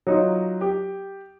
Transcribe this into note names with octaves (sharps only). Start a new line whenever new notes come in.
F#3 D#4 F4
G4